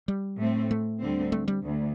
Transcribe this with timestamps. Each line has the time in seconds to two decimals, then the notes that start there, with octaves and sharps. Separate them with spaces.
0.08 G3
0.39 A2 A3 C4
0.71 A3
1.01 D2 D3 G3 C4
1.32 A3
1.48 G3
1.64 D2